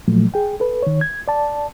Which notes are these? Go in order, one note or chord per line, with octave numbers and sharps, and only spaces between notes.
A#2 F3 F#3 A3
G#4 G5
A4 B4
D#3 C#5
G#6
D5 A5